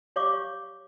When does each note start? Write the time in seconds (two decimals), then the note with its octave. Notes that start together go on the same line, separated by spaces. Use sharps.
0.16 G4 C#5 F5 C#6 D6